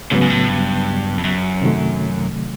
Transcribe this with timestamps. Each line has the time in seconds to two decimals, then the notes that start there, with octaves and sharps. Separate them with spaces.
0.11 G#2 C#3 F#3 B3
0.22 G#2
0.30 A2
0.49 G2
1.18 F2
1.25 F#2
1.61 C3 D#3 F#3 A3